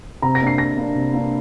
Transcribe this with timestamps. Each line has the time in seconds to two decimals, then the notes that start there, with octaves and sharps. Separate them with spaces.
0.22 C3 A#5
0.35 A#6
0.41 A#3 D4
0.47 C7
0.58 C3 A#6
0.77 A#3 D4
0.95 C3
1.13 A#3 D4